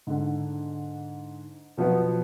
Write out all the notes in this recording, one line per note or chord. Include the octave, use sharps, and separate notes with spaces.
G#2 D3
B2 F3 F#3 B3